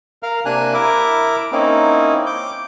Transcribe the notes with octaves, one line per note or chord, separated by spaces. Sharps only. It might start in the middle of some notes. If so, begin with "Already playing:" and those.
A#4 F5 F6
C3 A#3 D4 G#5 F#6
E4 A#4 E5 D6
A#3 C4 C#4 D#4 E4
D6 G6